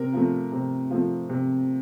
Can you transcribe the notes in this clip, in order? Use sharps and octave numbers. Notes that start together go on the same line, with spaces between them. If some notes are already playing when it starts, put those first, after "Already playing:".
Already playing: C3 A#4
F3 A3
C3
F3 A3
C3